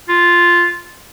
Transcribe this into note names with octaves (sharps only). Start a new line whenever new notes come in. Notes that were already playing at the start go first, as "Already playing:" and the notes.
F4